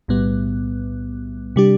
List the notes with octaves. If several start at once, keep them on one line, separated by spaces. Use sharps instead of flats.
B1 A2 G3 B3
C3 G3 D4 G4